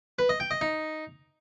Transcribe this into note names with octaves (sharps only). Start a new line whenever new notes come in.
B4
D#5
G5
D#5
D#4